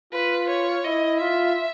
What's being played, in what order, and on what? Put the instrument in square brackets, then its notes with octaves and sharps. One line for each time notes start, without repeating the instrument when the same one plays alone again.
[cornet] F4 [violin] B4
[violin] C#5
[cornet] E4 [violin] D#5
[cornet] F4 [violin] E5